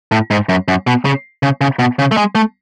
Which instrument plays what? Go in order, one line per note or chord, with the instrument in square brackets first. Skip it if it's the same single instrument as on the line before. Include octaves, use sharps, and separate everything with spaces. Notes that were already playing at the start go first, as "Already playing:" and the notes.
[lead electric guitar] A2
G#2
F#2
F#2
B2
C#3
C#3
C#3
B2
C#3
A3
G#3
A3